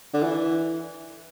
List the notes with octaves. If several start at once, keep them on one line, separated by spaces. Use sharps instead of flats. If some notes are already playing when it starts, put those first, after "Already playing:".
D3
E3